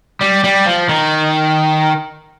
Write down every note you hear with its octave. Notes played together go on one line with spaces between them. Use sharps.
G3
G3
F3
D#3